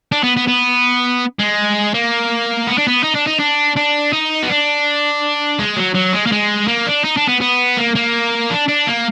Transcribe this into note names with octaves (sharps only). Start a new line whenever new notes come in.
D4
B3
B3
B3
G#3
A#3
B3
D4
B3
D#4
D4
D#4
D4
D4
D#4
B3
D4
G#3
F#3
F#3
G#3
A#3
G#3
A#3
D4
D#4
D4
B3
B3
A#3
A#3
D4
D4
A#3